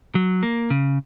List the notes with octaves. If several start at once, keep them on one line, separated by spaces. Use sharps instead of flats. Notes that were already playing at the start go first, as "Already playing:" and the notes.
F#3
A#3
C#3